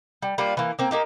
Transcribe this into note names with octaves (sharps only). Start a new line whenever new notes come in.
G3
G3 A#3 D4 F4
E3 A#3
A#3 C4
A#3 D#4 G4